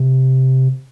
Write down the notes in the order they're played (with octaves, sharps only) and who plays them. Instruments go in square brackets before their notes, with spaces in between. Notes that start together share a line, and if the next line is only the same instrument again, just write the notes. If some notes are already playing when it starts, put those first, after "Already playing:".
Already playing: [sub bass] C3